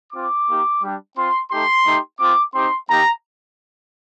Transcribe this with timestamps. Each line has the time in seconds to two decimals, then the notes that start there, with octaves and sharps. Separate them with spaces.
0.13 C4 F4 D6
0.47 A#3 D#4 G4
0.81 G3 D4 G4
1.16 C4 F4 C6
1.50 A3 D#4 G4 C6
1.85 A3 D#4 G4
2.19 C4 F4 D6
2.54 C4 D#4 G4 C6
2.88 A#3 D#4 G4 A#5